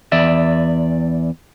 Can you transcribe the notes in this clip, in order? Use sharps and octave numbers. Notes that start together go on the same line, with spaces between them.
E2 D5 E5